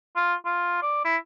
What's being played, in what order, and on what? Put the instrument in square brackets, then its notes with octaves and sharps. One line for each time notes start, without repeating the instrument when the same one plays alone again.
[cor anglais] F4
F4
D5
E4